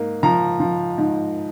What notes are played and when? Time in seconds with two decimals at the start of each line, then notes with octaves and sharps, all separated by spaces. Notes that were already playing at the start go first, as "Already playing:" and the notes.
Already playing: G#2 A#3
0.23 F3 A#5
0.60 F3
0.98 G#2